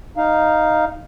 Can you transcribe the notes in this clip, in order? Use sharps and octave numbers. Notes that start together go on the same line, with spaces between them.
D#4 F5